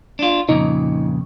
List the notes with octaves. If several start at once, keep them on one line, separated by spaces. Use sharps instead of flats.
D4 F4
F2 A#2 C#3 D#4